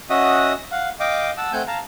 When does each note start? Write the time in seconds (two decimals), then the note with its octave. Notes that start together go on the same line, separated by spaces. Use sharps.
0.10 C#4 F#4 D#5 E5 F#5 D#6
0.71 F5 F#5
1.00 D#5 F5 G5 D6
1.37 F#5 A5 E6
1.53 A3 C4 F#5 G#5 G6
1.67 F5 A5 A#5